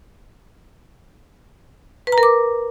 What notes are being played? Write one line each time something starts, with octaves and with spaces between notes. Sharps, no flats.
B4
A#5
A#4
D6